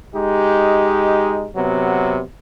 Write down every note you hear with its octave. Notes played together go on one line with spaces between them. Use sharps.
G#3 D#4 G4
C3 F#3 B3